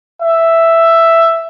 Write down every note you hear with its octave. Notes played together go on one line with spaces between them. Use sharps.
E5